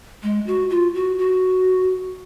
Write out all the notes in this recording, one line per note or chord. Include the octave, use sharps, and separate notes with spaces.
G#3
F#4
F4
F#4
F#4